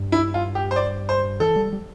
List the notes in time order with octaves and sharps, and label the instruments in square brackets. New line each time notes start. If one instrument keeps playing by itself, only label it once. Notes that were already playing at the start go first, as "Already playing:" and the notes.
Already playing: [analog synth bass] G2
[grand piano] E4
F4
G4
C5
D5
C5
[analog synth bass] E3 [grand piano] A4
[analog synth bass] G3
G3